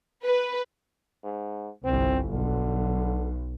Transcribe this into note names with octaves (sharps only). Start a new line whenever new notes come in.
B4
G#2
G1 C2 C4
B1 D3